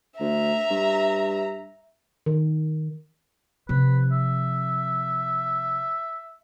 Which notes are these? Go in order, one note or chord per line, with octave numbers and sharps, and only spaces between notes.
D2 E5 A#5
G2
D#3
C3 F3 B4
E5